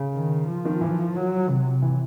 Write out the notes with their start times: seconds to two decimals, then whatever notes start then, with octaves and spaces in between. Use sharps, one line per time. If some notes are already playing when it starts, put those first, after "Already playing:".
Already playing: C#3
0.14 D#3
0.47 F3
0.65 D#3
0.81 E3
1.16 F#3
1.50 C3
1.82 E3